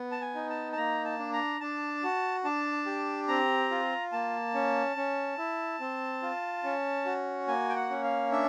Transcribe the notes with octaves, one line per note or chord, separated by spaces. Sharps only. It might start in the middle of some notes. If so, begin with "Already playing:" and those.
Already playing: B3
A5
G#5
D#4
A5
A5
A#3 A#5
A5
D4
A#5
D4 A5
F#4
D4 A5
G4
C4 A#5
F4
A#3 A5
C#4
C#4
E4
C4
F4
C#4
F#4
A#3 G#5
G5
F#5
C#4
F5
D4 E5